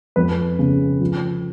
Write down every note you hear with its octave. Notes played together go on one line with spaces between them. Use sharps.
F2 B4
C#3
F3